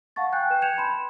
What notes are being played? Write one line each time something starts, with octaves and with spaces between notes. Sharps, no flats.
F5 F#5 A5 C#6 A6
G5 G#5 F#6 G6
B4 G5 E7
G6 G#6 C#7 E7 F7
A5 B5 C6 E7